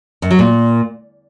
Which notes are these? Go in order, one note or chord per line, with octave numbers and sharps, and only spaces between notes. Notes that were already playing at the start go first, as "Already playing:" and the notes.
F#2
F#3
A#2